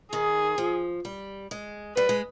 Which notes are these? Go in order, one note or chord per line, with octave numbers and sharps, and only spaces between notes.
D#3 G#4
F3
G3
G#3
G3 B4
G#3